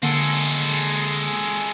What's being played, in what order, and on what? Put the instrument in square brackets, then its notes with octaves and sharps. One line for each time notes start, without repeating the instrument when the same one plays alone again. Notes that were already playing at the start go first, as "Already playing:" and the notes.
[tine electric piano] D3 A#3 F#5 [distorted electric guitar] G#3 A4